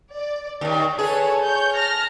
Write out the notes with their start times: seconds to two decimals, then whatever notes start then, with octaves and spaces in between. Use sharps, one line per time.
0.16 D5
0.61 D#2 D#3 D5
0.99 G#4 A4 B4 C#5
1.44 C#5 G6
1.75 A5 F6 A#6